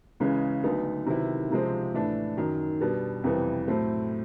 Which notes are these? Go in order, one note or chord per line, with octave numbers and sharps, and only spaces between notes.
C#2 C#3 E3 G#3 C#4
D2 D3 F#3 B3 D#4
C3 D#3 F#3 B3 E4
C#2 C3 F3 G#3 C4
A2 E3 A3 D4
F#2 D#3 F#3
B2 G3 B3 D4
F2 C3 E3 G3 B3
A2 F#3 A3 C4